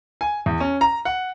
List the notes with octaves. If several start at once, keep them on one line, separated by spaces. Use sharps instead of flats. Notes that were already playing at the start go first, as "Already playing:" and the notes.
G#5
E2
C#4
A#5
F#5